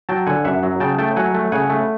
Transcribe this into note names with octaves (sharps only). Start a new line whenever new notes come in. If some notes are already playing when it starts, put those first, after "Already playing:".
F#3 G5 A5
D3 F#5 G#5
F#2 E5 F#5
F#3
C#3 G5 A5
A3 G5 A5
F#3 F#5 G#5
A3
C#3 F#5 G#5
A3